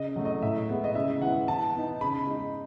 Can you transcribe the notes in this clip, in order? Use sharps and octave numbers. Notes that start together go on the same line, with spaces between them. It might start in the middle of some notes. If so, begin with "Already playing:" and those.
Already playing: C#3 D#5
F#3 A3
D#5
A2 E5
G#3 B3
D#5
C#3 E5
E3 G#3 B3 F#5
E3 A5
B3 D#4
C#3 B5
G#3 D#4